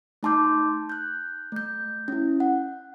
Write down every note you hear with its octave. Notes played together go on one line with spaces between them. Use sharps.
A3 D#4 A5 C6 D6 G6
F#6 G6
A3 G6
C#4 E4
F#5